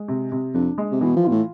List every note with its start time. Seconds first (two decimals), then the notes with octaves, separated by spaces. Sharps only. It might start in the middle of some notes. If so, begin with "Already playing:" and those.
Already playing: G#3
0.08 C3
0.32 C3
0.54 F2 D4
0.78 G#3
0.92 C3
1.01 B2 E3
1.16 F3
1.24 B2 F4
1.31 A2